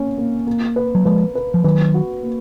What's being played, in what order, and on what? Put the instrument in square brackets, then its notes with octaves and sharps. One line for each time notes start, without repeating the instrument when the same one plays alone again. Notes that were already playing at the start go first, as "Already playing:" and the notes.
Already playing: [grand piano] A#3 C#4
A#3
A#3
B4
[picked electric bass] F#3
[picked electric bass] F3 G#3 [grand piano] B4
[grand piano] B4
[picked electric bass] F3
[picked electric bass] D#3 F#3 [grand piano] B4
[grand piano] F#4
A#3